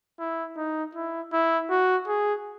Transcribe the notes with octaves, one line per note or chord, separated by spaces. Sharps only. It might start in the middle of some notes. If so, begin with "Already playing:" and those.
E4
D#4
E4
E4
F#4
G#4